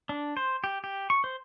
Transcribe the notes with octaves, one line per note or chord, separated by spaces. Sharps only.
D4
C5
G4
G4
C#6
C5